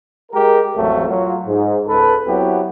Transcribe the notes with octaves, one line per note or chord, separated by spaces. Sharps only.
G#3 G4 G#4 A#4
A1 F2 F#3 G#3 A3
F#3 F4
G#2
C#2 A4 B4
F#3 B3 C4 E4 F#4 G4